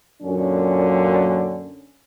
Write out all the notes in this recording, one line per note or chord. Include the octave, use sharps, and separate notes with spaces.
F#2 A#2 D3 C#4